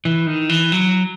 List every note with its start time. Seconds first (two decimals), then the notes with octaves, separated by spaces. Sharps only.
0.05 E3
0.27 D#3
0.49 E3
0.72 F#3